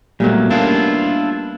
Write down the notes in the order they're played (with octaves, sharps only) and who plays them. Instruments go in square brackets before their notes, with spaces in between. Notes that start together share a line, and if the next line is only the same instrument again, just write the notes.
[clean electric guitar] A#2 F#3 [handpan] G3 A3 B3
[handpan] A#3 B3 C#4 [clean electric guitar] D4 E4 F4